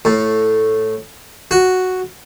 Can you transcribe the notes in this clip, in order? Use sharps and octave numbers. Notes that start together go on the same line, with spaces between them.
A2
F#4